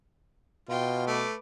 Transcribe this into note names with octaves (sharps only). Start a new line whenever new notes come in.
B2 F4 G5 C6
A3 B4 D6